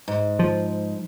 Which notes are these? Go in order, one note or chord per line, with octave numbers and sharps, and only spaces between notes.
G#2
F3